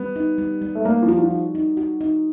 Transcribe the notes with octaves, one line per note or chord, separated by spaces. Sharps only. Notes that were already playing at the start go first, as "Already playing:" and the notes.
Already playing: G3 B3
D#4
G3
G3
A3
G3 A#3
F3
F#4
F3
D#4
D#4
F#4
D#4